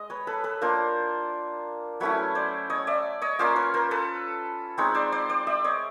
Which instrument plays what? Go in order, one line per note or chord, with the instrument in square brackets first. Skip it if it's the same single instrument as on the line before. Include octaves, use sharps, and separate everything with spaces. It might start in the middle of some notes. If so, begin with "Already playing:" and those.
Already playing: [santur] G#3 D#5
B4 C#5
A4 B4
A4 B4
A#3 D4 F4 A#4 C5
F#3 A3 C#4 E4 B4 C#5
C5 D5
C#5 D#5
D5 E5
C#5 D#5
A#3 C#4 F4 C5 D5
B4 C#5
A#4 C5
A4 B4
G#3 C4 D#4 B4 C#5
C5 D5
C5 D5
C5 D5
D5 E5
C#5 D#5